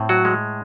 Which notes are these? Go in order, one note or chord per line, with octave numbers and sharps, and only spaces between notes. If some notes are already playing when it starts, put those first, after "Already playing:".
Already playing: A2 C4
F#3 F#4
G#3